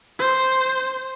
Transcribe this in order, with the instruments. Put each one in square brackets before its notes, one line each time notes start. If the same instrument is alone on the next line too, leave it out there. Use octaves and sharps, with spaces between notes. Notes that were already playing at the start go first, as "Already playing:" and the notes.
[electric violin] C5